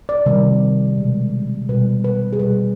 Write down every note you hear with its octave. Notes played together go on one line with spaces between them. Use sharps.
D5
C3 D#3 G3
B2 G#3
B2 G3 B4
B4
G#4
B2 G3 B4